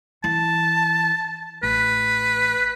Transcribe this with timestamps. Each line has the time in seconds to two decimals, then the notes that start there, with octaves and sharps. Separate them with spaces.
0.24 E3 A5
1.63 A1 B4